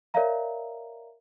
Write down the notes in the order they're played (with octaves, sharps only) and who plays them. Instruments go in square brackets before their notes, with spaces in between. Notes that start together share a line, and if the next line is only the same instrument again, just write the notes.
[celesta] A#4 C#5 D5 E5 F5 A#5